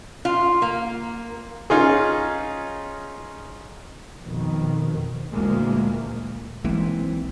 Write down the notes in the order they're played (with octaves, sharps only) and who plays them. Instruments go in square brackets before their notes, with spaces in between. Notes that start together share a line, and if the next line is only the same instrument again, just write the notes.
[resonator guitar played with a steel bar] F4
A#3
[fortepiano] C#4 D#4 F4 G#4
[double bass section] F2 B2 D#3
D2 A#2 E3 G#3 A#3
[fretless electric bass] B1 G#3 A#3 [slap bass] E3 [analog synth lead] C4